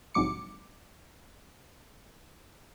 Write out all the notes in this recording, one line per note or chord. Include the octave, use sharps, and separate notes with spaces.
A#1 G#2 C3 F#3 D6 C#7